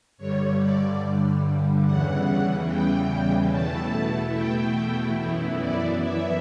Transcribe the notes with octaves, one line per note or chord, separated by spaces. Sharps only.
G2 D3 G3 C#5
D5
E2 C#3 E3 G3 F#5
G5
E2 B2 A3 E4 A5
G5
F#2 E3 B3 E4
D5
E5